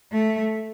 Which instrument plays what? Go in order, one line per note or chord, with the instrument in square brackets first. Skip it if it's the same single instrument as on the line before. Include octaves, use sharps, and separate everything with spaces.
[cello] A3